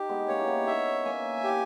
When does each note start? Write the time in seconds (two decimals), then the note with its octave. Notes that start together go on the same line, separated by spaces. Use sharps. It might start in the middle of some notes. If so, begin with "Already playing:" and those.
Already playing: D#4 G4
0.09 G#3 B3
0.28 A#3 C#4 C#5
0.39 E4
0.47 B3 D#4
0.67 B3 D#4 E5
1.05 A#3 C#4 G#5
1.44 C#4 E4 G4